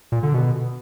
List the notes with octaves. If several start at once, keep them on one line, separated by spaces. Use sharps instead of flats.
A#2
D3
B2